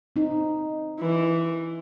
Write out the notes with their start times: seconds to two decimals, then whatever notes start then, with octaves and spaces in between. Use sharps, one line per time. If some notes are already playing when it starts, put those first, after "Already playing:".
0.16 C4 D#4
1.00 E3